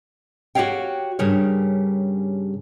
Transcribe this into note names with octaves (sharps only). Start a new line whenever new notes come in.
F#4 G4 A#4 C#5 F5 G5
G2 C#3 G3 A#4 C#5